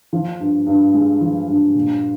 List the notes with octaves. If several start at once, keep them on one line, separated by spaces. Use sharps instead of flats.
F3
G2
G2
G#3
F3
G2
A#2